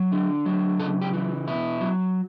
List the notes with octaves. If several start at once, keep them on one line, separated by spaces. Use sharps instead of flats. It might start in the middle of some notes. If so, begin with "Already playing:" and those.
Already playing: F#3
D3
F#3
C#3 A4
G4
E3
B2 E4
F#3